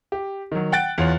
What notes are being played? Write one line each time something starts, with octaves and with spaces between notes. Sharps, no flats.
G4
D#3 F#3
F#5 G5 F#6 A6 D7
E2 F4 C#5 F7